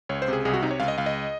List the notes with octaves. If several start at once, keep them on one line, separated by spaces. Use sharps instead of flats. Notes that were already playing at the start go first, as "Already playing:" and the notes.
C#2 C#5
C5
C3 G#4
C2 G#4
F#4
C3 D#4
C#5
C#2 F5
D#5
C#2 F5
D#5